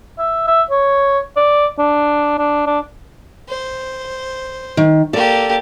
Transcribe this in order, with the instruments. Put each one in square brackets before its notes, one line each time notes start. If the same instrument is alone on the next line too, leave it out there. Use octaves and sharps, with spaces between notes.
[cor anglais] E5
E5
C#5
D5
D4
D4
D4
[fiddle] C5
[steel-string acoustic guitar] D#3
[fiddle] A#3 G4 [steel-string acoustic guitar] A4 D5